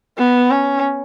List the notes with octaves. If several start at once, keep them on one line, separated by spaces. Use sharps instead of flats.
B3
C#4